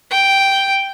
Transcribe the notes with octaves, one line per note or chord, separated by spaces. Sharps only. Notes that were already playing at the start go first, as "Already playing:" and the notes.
G5